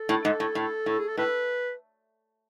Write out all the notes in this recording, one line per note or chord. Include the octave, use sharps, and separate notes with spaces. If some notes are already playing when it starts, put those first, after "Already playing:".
Already playing: A4
A2
G#2
A2
A2
A2
G#4
A4
A2 B4